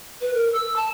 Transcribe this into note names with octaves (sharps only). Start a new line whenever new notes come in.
B4
A#4
E6
A5